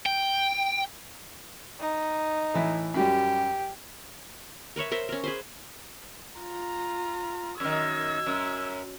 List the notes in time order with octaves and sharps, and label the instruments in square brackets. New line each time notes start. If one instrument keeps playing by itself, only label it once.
[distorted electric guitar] G5
[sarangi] D#4
[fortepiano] A2 E3
[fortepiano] F#2 F#3 G3 [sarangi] G4
[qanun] A#4 B4 C#5 E5
A#4 C5 E5
C#4 A#4
G#4 B4 C5
[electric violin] F4 A#5
[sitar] F#2 D#3 [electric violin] E6 G#6
[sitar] F#2